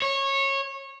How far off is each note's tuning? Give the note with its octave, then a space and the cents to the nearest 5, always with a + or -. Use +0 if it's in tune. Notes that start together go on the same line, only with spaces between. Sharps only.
C#5 -20